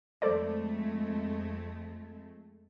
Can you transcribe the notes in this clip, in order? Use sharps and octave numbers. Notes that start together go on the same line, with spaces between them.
F2 G#3 A3 A4 C5 D5